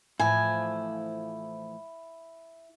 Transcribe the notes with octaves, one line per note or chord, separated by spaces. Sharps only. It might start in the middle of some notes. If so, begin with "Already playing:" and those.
A2 E3 F3 E4 G#5